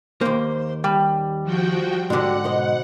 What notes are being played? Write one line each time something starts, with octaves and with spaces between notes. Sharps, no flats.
D#2 A#3 C5
G3
F3 F#4 G5
G#2 D3 D4 F#4 G4 F#5
B2 C5 D#5